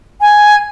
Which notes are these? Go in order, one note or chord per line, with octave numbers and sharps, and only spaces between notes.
G#5